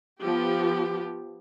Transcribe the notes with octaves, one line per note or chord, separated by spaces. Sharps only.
F3 B3 G4